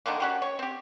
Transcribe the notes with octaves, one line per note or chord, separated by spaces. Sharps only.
D3 D#3 F3 A#3
C#4 F#4 G4
C#5
C4 G4